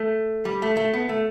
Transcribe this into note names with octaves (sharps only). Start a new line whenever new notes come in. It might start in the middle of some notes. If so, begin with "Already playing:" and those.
Already playing: A3
G3
A3
A3
B3
A3